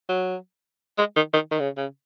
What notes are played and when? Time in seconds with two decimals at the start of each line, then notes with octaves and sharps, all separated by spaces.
0.09 F#3
0.98 G#3
1.16 D#3
1.34 D#3
1.51 D#3
1.60 C#3
1.77 C#3